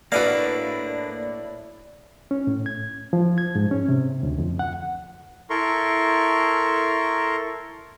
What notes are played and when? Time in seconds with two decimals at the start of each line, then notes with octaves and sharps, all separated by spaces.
0.12 A2 A#3 D4 E4 F#4 B4 D5 F5
2.31 C#4
2.47 A2
2.66 G#6
3.13 F3
3.38 G#6
3.55 G#2
3.71 C#4
3.89 C3
4.23 D2
4.38 F2
4.59 F#5
5.50 E4 A4 A#4 A#5 C6 C#6